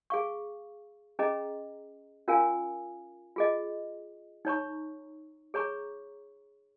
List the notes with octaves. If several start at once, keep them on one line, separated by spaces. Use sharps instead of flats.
G#4 F5 C#6
C#4 G#4 D#5 A#5
C#4 F4 A#4 F5 G#5
F4 G#4 D#5
D#4 C#5 A#5 C#6
G#4 C#5 A#5 C#6